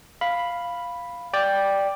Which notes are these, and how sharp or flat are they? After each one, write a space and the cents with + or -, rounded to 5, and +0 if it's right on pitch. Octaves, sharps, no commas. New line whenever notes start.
F5 +0 B5 +0
D5 +0 G5 +5